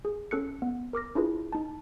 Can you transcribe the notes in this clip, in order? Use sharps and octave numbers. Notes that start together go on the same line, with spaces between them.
G#4
C#4 A4 F#6 C#7
B3
A#4 D6 F6 A#6
D4 E4 F4 G#4 B4
D#4 A5